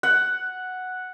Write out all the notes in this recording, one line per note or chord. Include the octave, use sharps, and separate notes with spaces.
F#5